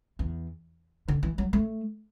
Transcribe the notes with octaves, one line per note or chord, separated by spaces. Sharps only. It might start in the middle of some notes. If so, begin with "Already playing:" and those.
E2
D3
E3
F#3
A3